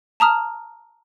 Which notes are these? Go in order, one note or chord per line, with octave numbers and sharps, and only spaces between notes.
A5 A#5 D#6 F6